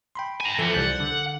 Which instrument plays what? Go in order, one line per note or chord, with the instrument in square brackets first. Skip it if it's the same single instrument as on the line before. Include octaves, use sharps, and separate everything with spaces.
[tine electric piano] G5 B5 C6
[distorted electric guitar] G#5 A#5
[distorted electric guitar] E3 B3 [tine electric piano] F3 A4
[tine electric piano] C2 G6 A6 [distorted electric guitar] F#5
[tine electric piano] D3